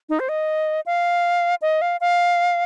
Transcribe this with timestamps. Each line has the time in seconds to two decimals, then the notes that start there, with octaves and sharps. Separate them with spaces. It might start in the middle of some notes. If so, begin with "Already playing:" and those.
0.09 D#4
0.20 C5
0.29 D#5
0.86 F5
1.62 D#5
1.82 F5
2.01 F5